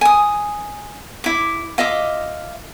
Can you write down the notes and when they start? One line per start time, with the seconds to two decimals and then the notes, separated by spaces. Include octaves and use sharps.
0.01 G#5 D#6
1.24 E4 D6
1.78 F4 D#5 E5 D6